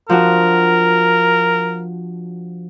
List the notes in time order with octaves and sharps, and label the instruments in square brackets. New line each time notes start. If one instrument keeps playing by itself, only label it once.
[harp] F3 D4 F#4 [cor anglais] A#4